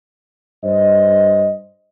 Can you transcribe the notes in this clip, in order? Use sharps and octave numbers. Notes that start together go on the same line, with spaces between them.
G2 C5 D#5